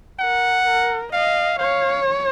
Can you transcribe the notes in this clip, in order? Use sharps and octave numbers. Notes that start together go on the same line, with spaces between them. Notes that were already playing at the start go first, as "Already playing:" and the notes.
A#4 F#5
A#4
D#5 F5
C#5 F5